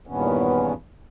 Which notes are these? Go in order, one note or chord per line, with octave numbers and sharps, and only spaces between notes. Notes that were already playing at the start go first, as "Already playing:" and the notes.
E2 G2 A#2 D#3 B3 C#4